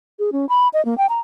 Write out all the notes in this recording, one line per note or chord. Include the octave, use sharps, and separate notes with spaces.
G#4
C#4
B5
D#5
A#3
G5
A#5